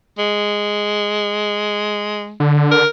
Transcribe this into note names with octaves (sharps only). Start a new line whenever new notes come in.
G#3
D3
A#4